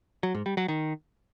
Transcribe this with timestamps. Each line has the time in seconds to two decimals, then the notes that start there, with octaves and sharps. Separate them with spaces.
0.23 F#3
0.35 G#2
0.46 G3
0.57 F#3
0.68 D#3